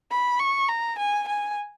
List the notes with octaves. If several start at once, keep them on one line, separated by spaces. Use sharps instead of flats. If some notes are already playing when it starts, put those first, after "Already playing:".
B5
C#6
A#5
G#5
G#5